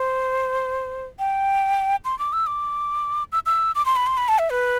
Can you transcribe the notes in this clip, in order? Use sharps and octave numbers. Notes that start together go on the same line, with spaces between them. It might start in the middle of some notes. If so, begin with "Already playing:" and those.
Already playing: C5
G5
C6
D6
E6
D6
E6
E6
D6
C6
B5
C6
B5
A5
E5
B4